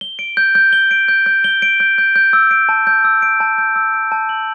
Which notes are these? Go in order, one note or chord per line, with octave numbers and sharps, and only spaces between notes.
G7
D7
G6
G6
G7
D7
G6
G6
G7
D7
G6
G6
G6
E6
D7
A5
G6
E6
D7
A5
G6
E6
D7
A5
F#7